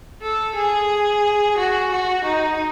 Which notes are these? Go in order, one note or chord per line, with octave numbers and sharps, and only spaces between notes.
A4
G#4
F#4
F#4
D#4